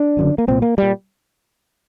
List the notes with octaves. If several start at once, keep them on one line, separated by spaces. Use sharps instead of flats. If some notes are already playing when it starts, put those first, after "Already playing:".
Already playing: D4
F#1 F#2 D3
A#3
C2 A#2 C4
A#3
A#2 G3